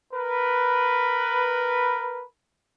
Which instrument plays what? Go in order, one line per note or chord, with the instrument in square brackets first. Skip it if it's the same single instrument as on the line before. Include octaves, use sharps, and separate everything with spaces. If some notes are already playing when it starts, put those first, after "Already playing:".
[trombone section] A#4 B4